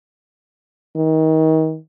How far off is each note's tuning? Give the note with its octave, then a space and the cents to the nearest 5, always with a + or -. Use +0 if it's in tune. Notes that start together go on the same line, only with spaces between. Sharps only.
D#3 +30